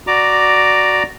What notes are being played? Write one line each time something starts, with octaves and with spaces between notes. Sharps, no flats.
F#4 D5 A#5 D6